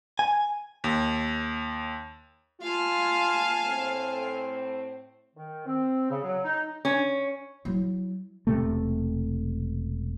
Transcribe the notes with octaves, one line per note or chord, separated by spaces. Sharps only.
G#5
D#2
F4 F5 G#5 A5
A2 A3 C4
D#3
C4
C#3
F#3
D#4
C#4
F#3 E4
E1 C3 A3